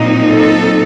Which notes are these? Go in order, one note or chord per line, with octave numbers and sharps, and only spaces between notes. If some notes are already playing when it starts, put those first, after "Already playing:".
Already playing: A#2 F#3 C4 D#4
A4